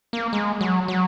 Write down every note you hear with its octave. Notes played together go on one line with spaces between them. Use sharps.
A#3
G#3
F#3
F#3